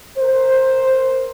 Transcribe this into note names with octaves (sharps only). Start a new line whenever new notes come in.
A#4 C5